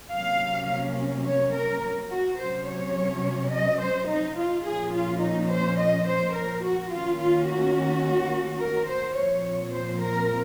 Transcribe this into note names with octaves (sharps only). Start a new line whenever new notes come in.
C3 F#3 A#3 C#4 F5
C#5
A#4
F#4
C3 F#3 C#4 C5
C#5
D#5
C5
D#4
F4
A#2 F3 A#3 C#4 G#4
F4
D#4
C5
D#5
C5
A#4
F#4
D#3 A#3 C#4 F4
F4
F#4
A#4
C5
A#2 F3 C4 C#5
C5
A#4